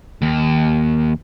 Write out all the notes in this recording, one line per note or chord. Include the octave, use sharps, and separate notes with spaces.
D#2